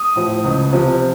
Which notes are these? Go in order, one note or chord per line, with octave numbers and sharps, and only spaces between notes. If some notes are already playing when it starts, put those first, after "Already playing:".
Already playing: D#6
A2 F3
C#2
C3 F3